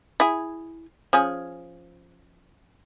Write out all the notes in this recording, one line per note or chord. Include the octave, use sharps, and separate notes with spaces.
E4 G#4
F3 C#4 G#4